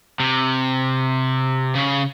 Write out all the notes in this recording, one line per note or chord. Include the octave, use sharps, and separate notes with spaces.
C3
C#3